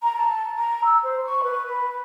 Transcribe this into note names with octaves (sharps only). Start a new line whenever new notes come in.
A#5
A5
A#5
E6
C5
C#6
B4
B4